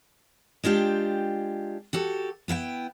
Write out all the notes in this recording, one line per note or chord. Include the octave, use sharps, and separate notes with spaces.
G#3 D4 F4 G4 G5
F#4 G4 A4
B3 E4 F5 G5